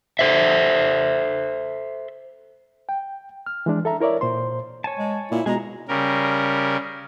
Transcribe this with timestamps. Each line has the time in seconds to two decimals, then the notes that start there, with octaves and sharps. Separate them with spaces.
0.19 A4 C5 E5
2.89 G5
3.46 F6
3.66 E3 G#3 D4
3.85 A4 E5 A#5
4.00 E4 A#4 C#5 D5 E5
4.21 A#2 C5 C6
4.84 C#5 G#5 A5
4.99 G#3
5.31 A#2 E4
5.46 B2 G#3 G#4 A#5
5.88 C#3 G3 A#4